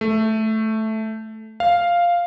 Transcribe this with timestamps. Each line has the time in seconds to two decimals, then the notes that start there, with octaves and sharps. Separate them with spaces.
0.01 A3
1.60 F5